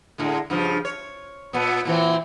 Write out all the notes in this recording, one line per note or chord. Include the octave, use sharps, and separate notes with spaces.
A2 D3 G#3
G2 C#3 F3
C#5
A#2 B3
A#2 E3 C4